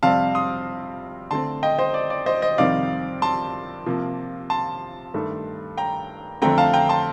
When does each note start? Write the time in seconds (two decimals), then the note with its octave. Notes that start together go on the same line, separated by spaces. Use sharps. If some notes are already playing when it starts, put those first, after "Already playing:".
0.03 F2 C3 G3 C4 F5 A5
0.35 C6 D#6
1.31 D3 A3 C4 A5 C6
1.63 D#5 G5
1.78 C5 D#5
1.94 D5
2.10 D5
2.26 C5 D#5
2.42 C5 D#5
2.58 F2 C3 D#3 G3 C4 D5 F5
3.22 A5 C6
3.86 C3 F3 A#3
4.50 A5 C6
5.14 G2 D#3 A3
5.77 G5 A#5
6.42 F2 D3 A3 C4 G5 A#5
6.58 F5 A5
6.73 G5 A#5
6.89 A5 C6